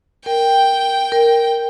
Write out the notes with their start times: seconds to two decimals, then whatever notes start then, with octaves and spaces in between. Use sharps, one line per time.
0.26 A#4 G5
1.12 A#4